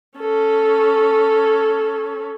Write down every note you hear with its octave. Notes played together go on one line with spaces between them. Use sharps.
C#4 A4